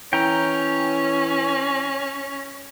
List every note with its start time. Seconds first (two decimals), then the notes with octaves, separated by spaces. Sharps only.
0.13 E3 C#4 G5 A#5